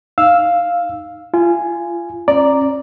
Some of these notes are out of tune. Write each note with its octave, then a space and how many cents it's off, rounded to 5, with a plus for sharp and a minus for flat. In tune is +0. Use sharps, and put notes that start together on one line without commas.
D#4 +0 F5 +0 E6 +0
F4 -25 G#5 +0
C#4 -40 D5 +0 A#5 +0